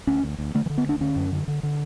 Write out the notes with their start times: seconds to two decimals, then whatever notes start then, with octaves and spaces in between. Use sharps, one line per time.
0.07 D2 C#4
0.23 D2
0.38 D2
0.55 D3 A3
0.66 E3
0.70 D3
0.78 B3
0.86 D2 D4
1.01 D3 C#4
1.16 F#2
1.32 D3
1.48 D3
1.63 D3